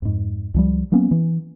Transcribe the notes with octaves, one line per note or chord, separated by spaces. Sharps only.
F2 G#2
C#2 F3 G3
F#3 A#3 B3 C#4
E3